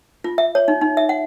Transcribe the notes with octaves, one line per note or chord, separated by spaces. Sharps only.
F4
E5
C#5
D#4
D#4
E5
F#5